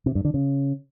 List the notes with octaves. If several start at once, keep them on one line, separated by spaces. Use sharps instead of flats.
C3
G2
D3
C#3